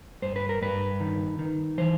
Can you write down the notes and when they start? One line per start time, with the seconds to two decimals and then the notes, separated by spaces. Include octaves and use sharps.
0.22 G2 C5
0.36 B4
0.49 A#4
0.61 G2 B4
1.00 D#3
1.39 D#3
1.78 E3 C5